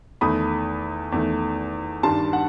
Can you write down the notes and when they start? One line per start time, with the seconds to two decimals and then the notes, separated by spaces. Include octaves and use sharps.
0.21 E2 D#3 A3 B5 D#6
1.12 E2 D#3 A3
2.03 G2 D#3 G3 A5 C6
2.33 F#5